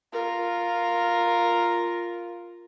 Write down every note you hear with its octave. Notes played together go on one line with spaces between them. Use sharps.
F4 A#4